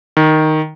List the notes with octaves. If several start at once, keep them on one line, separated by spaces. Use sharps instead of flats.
D#3